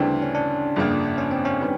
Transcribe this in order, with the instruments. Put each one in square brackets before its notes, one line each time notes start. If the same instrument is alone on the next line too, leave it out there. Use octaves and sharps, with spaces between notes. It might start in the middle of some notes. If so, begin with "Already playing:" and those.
Already playing: [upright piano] D2 C#3 E3 G3 C4 [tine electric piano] D4
[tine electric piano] C#4
D4
[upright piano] G1 F2 C#3 F3 A#3
[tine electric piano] C#4
C4
C#4
[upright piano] D#3 G3 B3